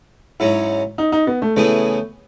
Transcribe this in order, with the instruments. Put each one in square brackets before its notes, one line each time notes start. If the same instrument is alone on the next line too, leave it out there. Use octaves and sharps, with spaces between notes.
[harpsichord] G#2 F#3 C#4 [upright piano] E4
[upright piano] D#4
D#4
B3
A3
[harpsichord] C#3 E3 B3 E4 G#4 [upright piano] A3